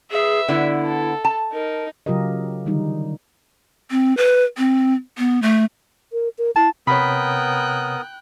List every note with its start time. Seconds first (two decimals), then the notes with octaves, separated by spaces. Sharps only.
0.11 G#4 B4 E5
0.48 D3 B3 E4
0.85 A4
1.25 A5
1.53 D#4 A#4
2.06 C#3 F#3 F4 G4 A#4 D#5
2.66 D3 D#3 G3 D#4
3.91 C4
4.17 B4
4.57 C4
5.18 B3
5.42 A3
6.13 A#4
6.38 A#4
6.56 E4 A5
6.87 C3 B3 A#4 C#5 G5 B5 D#6 F#6